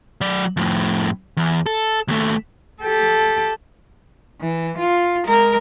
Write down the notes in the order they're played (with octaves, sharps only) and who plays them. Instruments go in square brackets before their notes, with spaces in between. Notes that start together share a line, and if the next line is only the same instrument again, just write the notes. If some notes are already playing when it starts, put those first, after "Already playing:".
[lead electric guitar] F#3 D5
F2 A2
E2
A4
D#2 A3
[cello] G4 A4
E3
F4
G#3 A#4